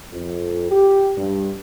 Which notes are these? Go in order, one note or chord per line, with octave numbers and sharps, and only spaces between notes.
F2
G4
G2